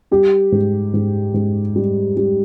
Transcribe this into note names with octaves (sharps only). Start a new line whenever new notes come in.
G3 G4
G#2
G#2
G#2
G3
G3